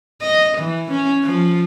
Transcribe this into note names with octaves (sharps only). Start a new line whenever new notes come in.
D#5
E3
C#4
F3